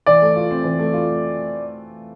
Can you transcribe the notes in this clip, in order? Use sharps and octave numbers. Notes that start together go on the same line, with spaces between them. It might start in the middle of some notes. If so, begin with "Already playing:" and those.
E3 D5
A3
F4
C4
E3
A3
F4